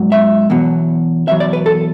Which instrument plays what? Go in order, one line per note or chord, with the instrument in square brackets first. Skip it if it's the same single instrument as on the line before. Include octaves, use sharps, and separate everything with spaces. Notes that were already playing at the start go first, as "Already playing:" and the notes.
Already playing: [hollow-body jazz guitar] G#2 F#3
E5
E2 B2 F#3
E2 B2 F#3 E5
D5
B4
A4